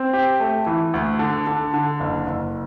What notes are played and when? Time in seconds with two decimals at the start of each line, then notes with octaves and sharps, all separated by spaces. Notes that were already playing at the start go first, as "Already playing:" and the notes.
Already playing: C4
0.13 G4
0.40 A3
0.66 E3
0.94 D2
1.19 D3
1.47 D3
1.74 D3
2.00 F#1
2.27 F#1